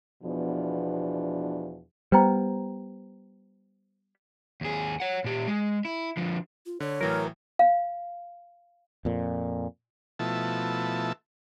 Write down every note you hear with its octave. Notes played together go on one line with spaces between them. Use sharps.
E2 B2 F3 D4
G3 B3 C5 G5 A#5
D#2 G#4
C#5 F#5
A#2 G4
G#3
E4
D3 F3
F4
D3 C#5
A2 E3 F#3 A#4
F5
F2 A#2
B2 F3 A3 E4 A5